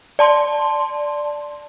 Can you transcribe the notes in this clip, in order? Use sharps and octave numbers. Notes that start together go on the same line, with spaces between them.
D5 A5 C6